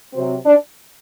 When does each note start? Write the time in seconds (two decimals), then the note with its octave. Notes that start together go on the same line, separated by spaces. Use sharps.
0.13 C3 F#3 C4
0.45 D4